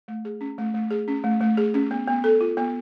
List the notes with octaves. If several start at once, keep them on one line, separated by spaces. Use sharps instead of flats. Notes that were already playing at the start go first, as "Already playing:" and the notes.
A3
G#4
C#4
A3
A3
G#4
C#4
A3
A3
G#4
C#4
B3
B3
A4
F4
B3